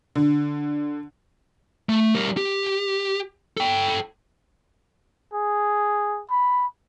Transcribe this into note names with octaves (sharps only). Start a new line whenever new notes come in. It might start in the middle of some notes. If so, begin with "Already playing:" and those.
D3
A3
G3 A#4
G4
A4 G5
G#4
B5